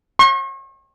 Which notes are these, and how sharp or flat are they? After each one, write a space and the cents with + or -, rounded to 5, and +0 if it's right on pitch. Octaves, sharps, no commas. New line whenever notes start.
C#6 -40